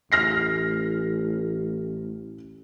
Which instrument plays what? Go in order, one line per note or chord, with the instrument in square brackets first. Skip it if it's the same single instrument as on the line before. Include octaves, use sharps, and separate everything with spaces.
[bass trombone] A1 [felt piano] F6 A#6 C7